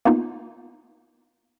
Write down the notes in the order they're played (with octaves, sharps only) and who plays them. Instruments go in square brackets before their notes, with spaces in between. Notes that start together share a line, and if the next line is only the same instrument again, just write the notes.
[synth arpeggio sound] A#3 B3 D#4 F4